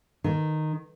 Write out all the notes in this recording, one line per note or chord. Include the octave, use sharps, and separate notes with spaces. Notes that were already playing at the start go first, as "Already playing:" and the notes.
D#3